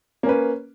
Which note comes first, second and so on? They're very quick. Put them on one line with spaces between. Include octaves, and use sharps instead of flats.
A#3 C#4 B4